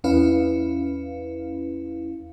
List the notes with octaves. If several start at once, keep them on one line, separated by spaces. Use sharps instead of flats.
E2 C#4 E4 B4 F5